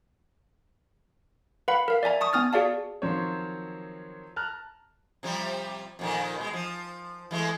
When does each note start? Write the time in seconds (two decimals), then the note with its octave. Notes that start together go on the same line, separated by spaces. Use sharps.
1.68 B4 F5 F#5 B5
1.88 A#4 F5
2.03 D5 E5 G#5 A#5
2.21 A5 C#6 D#6
2.33 B3 G#5 D#6 F6 A6
2.53 F#4 G#4 D5 F5 A5
3.02 D#3 F3 F#3 C4 C5 C#5
4.36 A5 A#5 F6 F#6
5.23 C3 F3 G3
5.99 F2 A#2 D#3
6.36 B2 G#3
6.53 F3
7.31 E3 G#3 A3